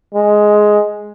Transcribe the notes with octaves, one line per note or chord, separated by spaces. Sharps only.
G#3